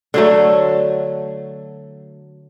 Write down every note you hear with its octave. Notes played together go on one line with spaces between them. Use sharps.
D3 F#3 A3